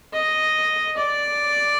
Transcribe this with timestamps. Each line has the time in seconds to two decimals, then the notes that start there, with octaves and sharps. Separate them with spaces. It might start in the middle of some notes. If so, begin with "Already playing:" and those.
0.13 D#5
0.97 D5